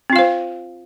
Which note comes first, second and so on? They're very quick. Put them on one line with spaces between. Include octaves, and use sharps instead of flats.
C4 F4 F5 C5